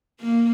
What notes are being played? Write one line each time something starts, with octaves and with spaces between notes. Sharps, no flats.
A#3